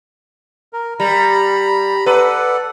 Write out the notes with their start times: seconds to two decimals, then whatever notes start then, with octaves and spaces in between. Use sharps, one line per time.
0.73 A#4
1.00 G3 A#5 B5
2.06 A4 B4 D5 F#5